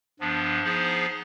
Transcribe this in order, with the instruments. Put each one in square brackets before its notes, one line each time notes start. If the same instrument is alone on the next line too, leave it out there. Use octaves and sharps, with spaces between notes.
[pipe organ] G2 F3 B3 D4
F3 B3 D#4 G#4 C5